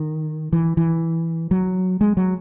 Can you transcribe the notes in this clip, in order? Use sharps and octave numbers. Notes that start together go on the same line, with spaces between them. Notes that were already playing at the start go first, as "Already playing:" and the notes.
Already playing: D#3
E3
E3
F#3
G#3
F#3